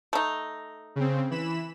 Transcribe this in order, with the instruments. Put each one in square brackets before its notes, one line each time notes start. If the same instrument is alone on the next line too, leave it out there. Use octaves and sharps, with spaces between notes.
[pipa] A3 D#4
[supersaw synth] C#3 C4
E3 B5 E7